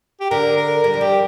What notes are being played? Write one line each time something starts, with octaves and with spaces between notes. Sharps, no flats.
G4
D3 A#4
A#4
G3 A#4
F3
G3 G4